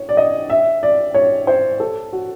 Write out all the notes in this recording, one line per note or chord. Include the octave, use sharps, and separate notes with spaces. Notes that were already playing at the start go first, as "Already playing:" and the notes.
Already playing: C#5
D5
D#5
E5
D5
C#5
C5
A4
F#4